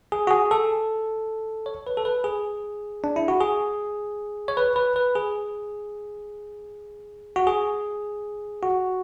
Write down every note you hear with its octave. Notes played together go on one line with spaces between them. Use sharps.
G#4
F#4
G#4
A4
C#5
B4
A4
B4
G#4
D4
E4
F#4
G#4
C#5
B4
B4
B4
G#4
F#4
G#4
F#4